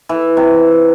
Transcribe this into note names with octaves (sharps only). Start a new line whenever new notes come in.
E3
C3